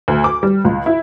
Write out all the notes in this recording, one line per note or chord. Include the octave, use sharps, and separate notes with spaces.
D2
D6
G3
C#2
E4